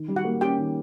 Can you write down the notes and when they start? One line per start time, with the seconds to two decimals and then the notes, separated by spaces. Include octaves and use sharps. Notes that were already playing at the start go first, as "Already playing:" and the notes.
Already playing: D#3
0.08 G3
0.16 F#4 F#5
0.24 A#3
0.41 C#4 G4 G5
0.58 D#3